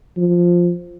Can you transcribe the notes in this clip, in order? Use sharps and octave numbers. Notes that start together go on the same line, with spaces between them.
F3